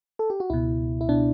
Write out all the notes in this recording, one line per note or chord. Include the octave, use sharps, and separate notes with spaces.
A4
G4
F#4
C#2 B2 E4
E4
B2 D4